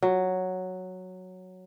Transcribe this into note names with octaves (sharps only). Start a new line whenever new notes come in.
F#3